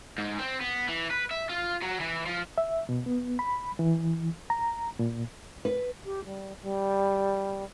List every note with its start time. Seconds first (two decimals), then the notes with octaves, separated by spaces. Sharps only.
0.18 G#2
0.39 C4
0.61 B3
0.89 E3
1.11 B4
1.31 E5
1.49 F4
1.82 F#3
2.00 E3
2.26 F3
2.58 E5
2.89 B2
3.06 B3
3.39 B5
3.79 E3
4.50 A#5
4.99 A#2
5.65 B4
6.05 G4
6.25 G3
6.62 G3